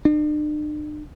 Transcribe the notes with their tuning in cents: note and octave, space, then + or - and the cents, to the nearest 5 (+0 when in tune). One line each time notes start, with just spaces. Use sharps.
D4 +45